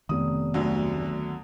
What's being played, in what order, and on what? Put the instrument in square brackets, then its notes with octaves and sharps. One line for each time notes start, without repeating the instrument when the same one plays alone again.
[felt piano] F1 D#6 [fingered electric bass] D#3 B3
[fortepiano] D2 [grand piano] D3 F#3